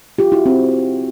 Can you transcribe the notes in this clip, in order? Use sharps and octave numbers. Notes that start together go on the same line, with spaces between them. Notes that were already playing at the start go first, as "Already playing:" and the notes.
F4 G4
E4 F#4
C4